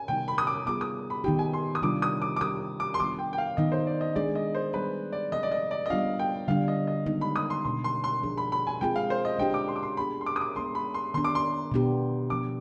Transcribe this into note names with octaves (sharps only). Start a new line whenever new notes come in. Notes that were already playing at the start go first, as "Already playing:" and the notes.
Already playing: G#5
C3 D#3 G3 B3 D#4 G5
B5
D#6
D6
G3 B3 F4 G#4 D6
D#6
B5
D#3 B3 D#4 G4 G5
G#5
C6
D#6
C3 D#3 G3 D4 F4 D6
D#6
D6
D6
G3 C4 G4 D#6
D6
C6
D#3 G3 B3 D4 F4 D6
G5
G5
F5
D#3 B3 D#4 D#5
C5
D5
D#5
G#3 D4 G#4 D5
D#5
C5
G3 B3 D4 G#4 B4
D5
C3 F3 G#3 C4 D#5
D5
D#5
D5
D#5
G3 B3 D4 F4 F5
G5
D3 G3 D4 F5
D#5
D#5
D#3 G#3 B3 D#4
B5
D#6
C6
B2 B3 D4 C6
C6
C6
F3 G#3 D4 G#4
B5
B5
G#5
G#3 C4 F4 G#4 G5
F5
C5
D#5
G#3 D4 G4 G5
D6
C6
D6
C6
G#3 B3 D4 G#4 B5
C6
D6
D#6
D6
G#3 B3 D4 G#4 C6
B5
C6
D#3 B3 D4 C6
D6
C6
B2 B3 D4 G4
F3 B3 D4 D6